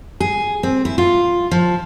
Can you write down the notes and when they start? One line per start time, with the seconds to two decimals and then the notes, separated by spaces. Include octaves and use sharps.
0.20 G#4
0.63 C4
0.85 E4
0.98 F4
1.51 F3